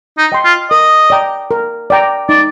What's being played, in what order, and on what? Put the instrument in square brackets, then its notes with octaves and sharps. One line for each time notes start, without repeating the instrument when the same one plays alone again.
[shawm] D#4
[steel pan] D#5 G5 C6
[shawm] F4
[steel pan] A#4 [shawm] D#5
[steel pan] D5 G5 A#5
A#4
D5 G5 A#5
[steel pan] D#4 [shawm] D5